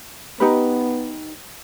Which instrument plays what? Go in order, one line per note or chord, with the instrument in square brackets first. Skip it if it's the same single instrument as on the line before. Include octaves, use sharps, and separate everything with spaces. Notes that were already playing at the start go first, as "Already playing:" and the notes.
[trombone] B3 [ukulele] D#4 G4 B4